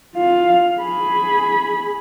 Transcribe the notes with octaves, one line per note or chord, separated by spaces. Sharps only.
F4 F5
G#4 B5